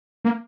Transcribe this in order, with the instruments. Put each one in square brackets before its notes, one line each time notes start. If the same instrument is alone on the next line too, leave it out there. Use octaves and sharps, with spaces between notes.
[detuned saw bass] A#3